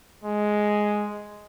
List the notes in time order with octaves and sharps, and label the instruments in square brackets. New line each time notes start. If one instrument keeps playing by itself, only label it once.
[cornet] G#3